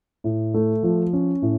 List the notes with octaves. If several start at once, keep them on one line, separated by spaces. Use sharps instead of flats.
A2
A3
F3
C#4
A2